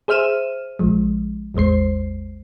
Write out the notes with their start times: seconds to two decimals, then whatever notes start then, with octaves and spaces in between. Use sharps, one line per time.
0.08 G#4 C5 E5 F6 D#7 E7
0.79 A#1 F3 G#3
1.54 A1 E2 G#3 C5 C7